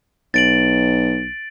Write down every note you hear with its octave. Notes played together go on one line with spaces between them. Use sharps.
B1 A6 D7 F#7